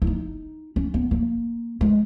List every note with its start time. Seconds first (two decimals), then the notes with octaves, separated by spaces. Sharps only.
0.02 E4
0.07 D#4
0.76 C#4
0.94 B3
1.11 A#3
1.81 G#3